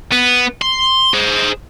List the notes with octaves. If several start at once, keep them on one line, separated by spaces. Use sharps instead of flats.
B3
C6
G#4 C5